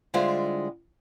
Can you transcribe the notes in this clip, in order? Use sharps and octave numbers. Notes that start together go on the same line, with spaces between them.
D3 G3 G#3 E4 F4 C5